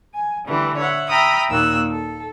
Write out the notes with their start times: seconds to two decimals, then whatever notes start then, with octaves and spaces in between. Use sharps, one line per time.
0.16 G#5
0.47 D3 E3 G3 A3
0.79 C#5 E5 F#5
1.09 E5 G5 A#5 B5 D#6 F6
1.50 D#2 A#2 D#3 A#3 E6 F#6
1.90 A4